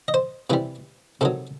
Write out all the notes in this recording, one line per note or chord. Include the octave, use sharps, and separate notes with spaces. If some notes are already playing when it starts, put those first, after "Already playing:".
D#5
C5
C3 E3 G3 B4
C3 D#3 F#3 A4